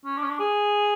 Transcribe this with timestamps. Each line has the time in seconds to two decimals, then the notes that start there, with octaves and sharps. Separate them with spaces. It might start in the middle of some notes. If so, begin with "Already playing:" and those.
0.05 C#4
0.17 D4
0.22 C#4
0.29 D4
0.39 G#4